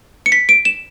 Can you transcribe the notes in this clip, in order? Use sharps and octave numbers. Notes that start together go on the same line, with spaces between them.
C#7
B6
D7
E7